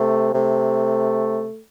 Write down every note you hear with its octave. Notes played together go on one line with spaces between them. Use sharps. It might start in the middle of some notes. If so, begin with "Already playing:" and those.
Already playing: C3 A3
C3 A3